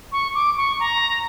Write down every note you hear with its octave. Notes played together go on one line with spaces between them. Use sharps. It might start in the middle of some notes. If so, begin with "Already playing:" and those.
C#6
D6
C#6
A#5